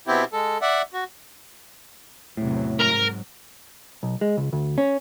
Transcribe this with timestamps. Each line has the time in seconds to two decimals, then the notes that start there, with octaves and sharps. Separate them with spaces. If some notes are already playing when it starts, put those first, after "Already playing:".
0.07 B2 B3 C4 E4 G4
0.33 G#3 A4
0.62 D5 E5 F#5
0.94 F#4
2.37 E2 A2 C3 F#3
2.79 G#2 F#3 A#4 A#5
4.03 B1
4.21 G#3
4.37 C#2
4.53 D2
4.78 C#4